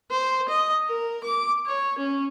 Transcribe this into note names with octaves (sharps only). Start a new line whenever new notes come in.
C5
D#5
A#4
D6
C#5
C#4